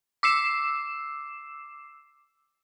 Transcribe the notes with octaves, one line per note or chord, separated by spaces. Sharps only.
D6 E6 C7 E7